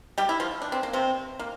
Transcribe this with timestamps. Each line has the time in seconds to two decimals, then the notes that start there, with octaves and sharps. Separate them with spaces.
0.18 G3 G4
0.29 E4
0.40 F3 F4
0.62 D4
0.72 C4
0.83 A#3
0.93 C3 C4
1.39 A#3